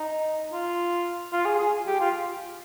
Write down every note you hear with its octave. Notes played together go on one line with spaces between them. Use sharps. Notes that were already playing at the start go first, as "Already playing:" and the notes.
Already playing: D#4
F4
F4
G#4
G#4
G4
F4